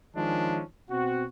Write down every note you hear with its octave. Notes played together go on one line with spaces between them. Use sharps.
D#3 F3 G#3 C#4 D4
B2 C4 F#4